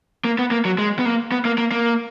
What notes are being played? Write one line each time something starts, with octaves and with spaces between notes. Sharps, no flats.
A#3
B3
A#3
F#3
G#3
B3
A#3
B3
A#3
A#3
A#3